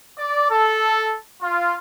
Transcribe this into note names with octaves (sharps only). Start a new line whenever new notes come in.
D5
A4
F4